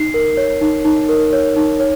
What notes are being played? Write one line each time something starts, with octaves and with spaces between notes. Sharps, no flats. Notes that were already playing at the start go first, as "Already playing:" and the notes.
Already playing: D#4 C7
A#4
C#5
D#4
D#4
A#4
C#5
D#4
C#5